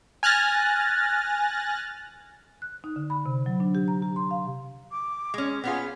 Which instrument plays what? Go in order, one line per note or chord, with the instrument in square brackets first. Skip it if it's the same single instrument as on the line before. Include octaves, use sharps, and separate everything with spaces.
[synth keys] G#5 F6 F#6 A6 A#6
[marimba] F#6
D#4
D3
B5
C3
F#3
D4
G4
A#5
G4
C6
F5
[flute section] D6
[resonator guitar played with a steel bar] G#3 C#4
[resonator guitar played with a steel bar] B3 C#4 F4 [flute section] G#4 F6